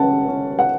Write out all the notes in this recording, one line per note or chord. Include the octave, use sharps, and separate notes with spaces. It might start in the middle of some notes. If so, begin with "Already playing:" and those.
Already playing: C#3 C#4 F#5 A5
C#4
F#5